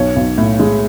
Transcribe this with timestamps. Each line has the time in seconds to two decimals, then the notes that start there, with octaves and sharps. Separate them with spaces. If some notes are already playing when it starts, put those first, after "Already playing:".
Already playing: B1 C#5
0.16 B1
0.38 A2
0.59 G#3